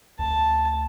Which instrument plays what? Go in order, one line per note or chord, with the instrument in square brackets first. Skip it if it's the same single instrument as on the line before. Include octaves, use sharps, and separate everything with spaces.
[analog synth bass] D2 [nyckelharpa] A5